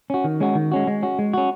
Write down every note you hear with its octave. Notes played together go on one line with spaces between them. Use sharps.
C#4 F#4
D#3
G#3 C#4 F#4
D#3
G#3 C#4 F#4
G#3
C#4 F#4
G#3
C#4 F#4